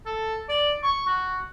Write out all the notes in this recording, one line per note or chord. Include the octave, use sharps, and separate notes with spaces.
A4
D5
C#6
F#4